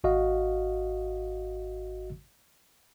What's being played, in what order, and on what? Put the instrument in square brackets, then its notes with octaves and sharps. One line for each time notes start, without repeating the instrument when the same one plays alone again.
[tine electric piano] G#1 F#4 D#5 F5